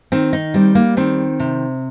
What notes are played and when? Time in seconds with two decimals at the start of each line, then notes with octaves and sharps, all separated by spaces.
0.12 D#3 C4
0.33 D#4
0.54 G3 C4
0.75 A#3
0.97 D#3 C4
1.40 C3